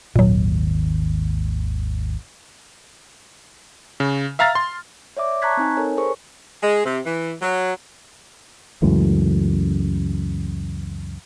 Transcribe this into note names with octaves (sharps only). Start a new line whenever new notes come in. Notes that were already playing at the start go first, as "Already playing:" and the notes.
G#1 D#2 A#2 F#3
C#3
E5 F5 A#5 F6 A6
C6
C#5 D5 E5 D6
A5 A#5 C#6 F#6 G#6 B6
C4 D#4 G#5
A4 A#4 C#5 G#5
G#4 A#4 C5 C#6
G#3
C3
E3
F#3
C#2 F#2 E3 A3